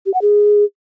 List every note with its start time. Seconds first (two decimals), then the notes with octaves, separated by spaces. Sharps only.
0.06 G4
0.14 F#5
0.22 G#4